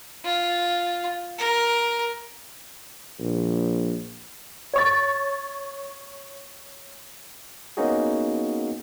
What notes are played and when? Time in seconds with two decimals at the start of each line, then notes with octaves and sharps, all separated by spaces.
0.25 F4
1.39 A#4
3.20 A#1
4.74 C#5 C#6 A6
7.77 A#3 B3 C#4 D#4 F#4 G#4